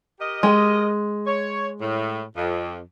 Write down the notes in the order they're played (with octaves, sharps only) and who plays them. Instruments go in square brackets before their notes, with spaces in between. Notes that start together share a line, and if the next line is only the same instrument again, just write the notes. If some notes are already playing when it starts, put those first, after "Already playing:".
[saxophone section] G4 A#4 D#5
[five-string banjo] G#3
[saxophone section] C#5
A2
F2